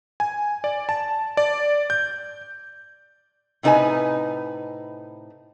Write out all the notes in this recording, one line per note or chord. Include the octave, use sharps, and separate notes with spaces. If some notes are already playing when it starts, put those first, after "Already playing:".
G#5
D5
A5
D5
G6
A2 C3 D#4 A#4 B4 G#5